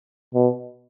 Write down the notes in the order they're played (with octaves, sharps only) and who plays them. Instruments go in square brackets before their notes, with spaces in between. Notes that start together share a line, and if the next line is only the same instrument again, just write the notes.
[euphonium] B2